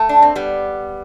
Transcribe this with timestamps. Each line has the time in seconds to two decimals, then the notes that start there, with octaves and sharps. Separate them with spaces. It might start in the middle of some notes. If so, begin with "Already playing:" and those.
Already playing: A3
0.09 D4
0.22 C4
0.35 G3 B3